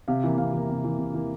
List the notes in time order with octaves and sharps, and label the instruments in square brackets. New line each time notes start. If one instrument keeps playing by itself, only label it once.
[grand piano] C3 F5
E3 A#3
C3 F5
E3 A#3
C3
E3 A#3
C3
E3 A#3